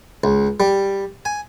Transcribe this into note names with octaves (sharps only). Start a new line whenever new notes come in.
C#2
G3
G#5